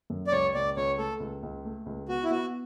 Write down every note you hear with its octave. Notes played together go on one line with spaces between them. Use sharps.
F#2
D5
C#2 C#5
C#2 D5
C#2 C#5
A3 A4
C#2
C#2
A3
C#2
B3 F#4
E4
B3 F#4